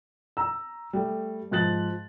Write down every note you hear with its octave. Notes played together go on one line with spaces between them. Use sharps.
A#5 E6
G3 A3
G#2 F3 F#6 A6 F#7